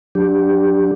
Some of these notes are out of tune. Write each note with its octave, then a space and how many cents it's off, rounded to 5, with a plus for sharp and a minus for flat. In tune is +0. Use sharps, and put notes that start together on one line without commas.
F#3 -25 D4 +0 G4 +0